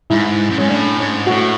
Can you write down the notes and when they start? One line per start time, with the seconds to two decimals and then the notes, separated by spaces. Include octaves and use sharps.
0.10 G#2 E4
0.49 F#2
0.58 G#2 C#4
0.68 A2 D4
0.98 G#2
1.26 A2 F#4